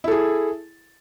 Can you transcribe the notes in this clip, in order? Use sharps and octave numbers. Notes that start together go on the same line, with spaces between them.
E4 G#4 A4